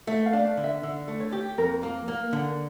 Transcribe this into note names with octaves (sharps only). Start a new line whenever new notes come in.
A3 E5
F5
D4
F5
D3
E5
D3
A3
C#5
G4
F2 A#4
A#3
A#3
D3